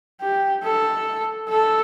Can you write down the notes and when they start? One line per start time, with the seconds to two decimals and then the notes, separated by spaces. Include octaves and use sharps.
0.21 G4
0.63 A4
1.49 A4